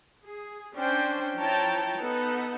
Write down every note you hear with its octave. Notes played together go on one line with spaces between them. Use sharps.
G#4
C#4 D4 C5 G5
F3 E4 C#5 G5 A5 A#5
B3 D#4 A4 F#5